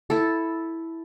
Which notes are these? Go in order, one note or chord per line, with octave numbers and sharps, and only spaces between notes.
E4 A4